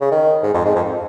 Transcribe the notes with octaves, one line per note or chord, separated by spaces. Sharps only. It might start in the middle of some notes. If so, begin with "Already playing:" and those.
C#3
D#3
G#2
F2
G#2
F2